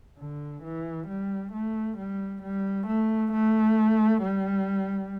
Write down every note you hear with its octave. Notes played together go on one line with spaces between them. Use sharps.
D3
E3
G3
A3
G3
G3
A3
A3
G3